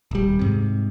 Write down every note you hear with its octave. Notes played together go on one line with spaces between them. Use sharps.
D#1 G3
G#2 C3